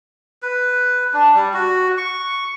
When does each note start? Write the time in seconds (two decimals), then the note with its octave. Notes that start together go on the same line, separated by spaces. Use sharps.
0.42 B4
1.14 D4
1.34 G3
1.54 F#4
1.98 C#6